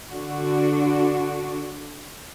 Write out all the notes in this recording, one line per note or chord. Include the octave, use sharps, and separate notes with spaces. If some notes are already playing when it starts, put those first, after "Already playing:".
D3 D4 F#4